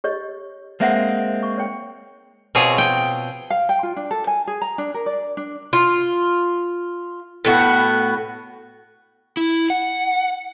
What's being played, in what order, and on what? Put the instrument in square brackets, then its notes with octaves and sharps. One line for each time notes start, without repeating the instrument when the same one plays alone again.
[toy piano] G4 C#5 D#5
[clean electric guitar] G#3 A#3 C4 [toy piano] B4 E5 F#5
[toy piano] C#6
C#5 G5
[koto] B2 C4 F4 G#4 C#5
G5
[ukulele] F5
G5
F4
D4
A4
G#5
G#4
A#5
D4
A#4
D5
D4
[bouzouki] F4
A2 B3 F#4
[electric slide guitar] E4
F#5